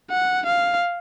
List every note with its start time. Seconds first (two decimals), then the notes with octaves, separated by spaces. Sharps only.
0.10 F#5
0.46 F5